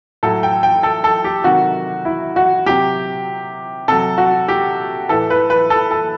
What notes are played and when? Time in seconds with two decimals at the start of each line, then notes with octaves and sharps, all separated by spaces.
0.23 A2 F#3 A4
0.43 G5
0.63 G5
0.83 A4
1.04 A4
1.24 G4
1.44 C3 D#3 F#3 F#4
2.05 E4
2.36 F#4
2.66 C3 F#3 G4
3.88 C3 F#3 A4
4.18 F#4
4.48 G4
5.09 A2 E3 A4
5.30 B4
5.50 B4
5.70 A4
5.91 A4